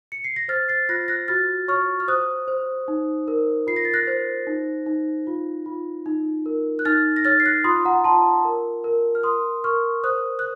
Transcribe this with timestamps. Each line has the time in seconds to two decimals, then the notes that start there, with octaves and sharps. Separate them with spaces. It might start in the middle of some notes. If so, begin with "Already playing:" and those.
0.12 C#7
0.24 C7
0.36 A#6
0.48 C5 F6 A6
0.68 A6 C7
0.89 F4 F#6 A#6
1.08 F#6 A#6
1.28 F#4 F6 A6
1.68 C#5 C#6 F6
2.00 F6
2.08 C5 D#6 F#6
2.48 C5
2.88 D#4
3.28 A#4
3.67 F4 C7
3.76 A#6
3.85 A6
3.94 F#6 A#6
4.07 C5
4.47 D#4
4.86 D#4
5.27 F4
5.66 F4
6.06 D#4
6.46 A#4
6.79 F#6
6.85 D#4 F6 A6
7.16 A#6
7.25 C#5 F6 A6
7.40 C7
7.45 F#6 A#6
7.64 F4 C6 D#6
7.85 F#5 A#5
8.04 F4 A5 C6
8.45 A#4
8.84 A#4
9.15 F6
9.23 A#4 C6 D#6
9.64 A#4 C#6 F6
10.04 C5 D#6 F#6
10.39 F#6